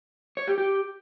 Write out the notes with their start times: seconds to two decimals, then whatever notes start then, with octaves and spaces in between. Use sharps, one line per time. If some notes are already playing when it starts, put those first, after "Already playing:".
0.37 C#5
0.47 G4
0.58 G4